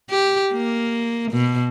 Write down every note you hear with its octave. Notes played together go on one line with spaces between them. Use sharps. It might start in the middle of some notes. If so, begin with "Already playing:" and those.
G4
A#3
B2